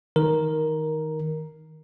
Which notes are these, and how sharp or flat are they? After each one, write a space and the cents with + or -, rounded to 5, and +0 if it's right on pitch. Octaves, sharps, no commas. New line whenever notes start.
D#3 +15 A#4 +5